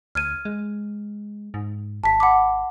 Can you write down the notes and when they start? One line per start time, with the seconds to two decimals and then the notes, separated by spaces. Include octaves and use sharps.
0.15 D2 F6 G#6 D#7
0.45 G#3
1.54 G#2
2.04 G#1 A5 B6
2.20 F#5 B5 D6